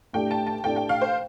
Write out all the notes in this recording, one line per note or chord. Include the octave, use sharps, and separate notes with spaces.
A2 A3 D4 G4 D5 G5
A5
A5
A2 A3 D4 G4 D5 G5
G5
F5
C5